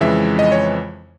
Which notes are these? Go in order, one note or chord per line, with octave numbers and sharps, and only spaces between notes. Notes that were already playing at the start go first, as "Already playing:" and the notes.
F2 C#3 E3 G#3 E5
D#5
C#5